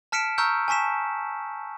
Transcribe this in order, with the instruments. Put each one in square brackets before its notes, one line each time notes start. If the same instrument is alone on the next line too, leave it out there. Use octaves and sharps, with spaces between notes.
[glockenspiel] A5 F6 B6 C#7 D7 E7
A#5 C#6 E6 F6 G6
G#5 A5 C#6 B6 E7